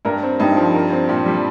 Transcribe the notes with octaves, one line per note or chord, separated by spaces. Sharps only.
G2 A#4
C4
G2 D#4
F3
A#4
C4
A#2 G4
G3